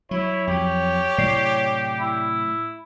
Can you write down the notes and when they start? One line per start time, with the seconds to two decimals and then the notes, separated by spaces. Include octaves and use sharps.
0.11 F#3 E4 C#5
0.47 F2 F#3 G4
1.18 A2 C3 F#3 D5 C7
2.00 E4